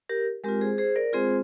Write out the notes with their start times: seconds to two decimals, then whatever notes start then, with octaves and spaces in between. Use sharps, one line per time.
0.09 G4 A#4
0.44 G#3 C4 F4 G4 A#4
0.61 G#4 C5
0.78 G#4 C5
0.96 A#4 D5
1.13 G#3 C4 F4 G#4 C5